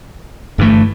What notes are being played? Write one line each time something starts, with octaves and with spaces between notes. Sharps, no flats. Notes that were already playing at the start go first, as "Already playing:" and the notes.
G1 G2 E3 A3